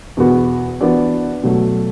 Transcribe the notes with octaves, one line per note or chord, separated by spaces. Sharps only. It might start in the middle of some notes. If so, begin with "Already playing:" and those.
E2 B2 B3 F#4
E3 B3 D4 F#4 D5
B2 F#3 A3